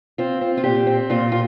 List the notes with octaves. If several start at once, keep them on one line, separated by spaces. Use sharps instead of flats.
C4 F4
C4
F4
A#2 G4
C4
A#2 F4
F4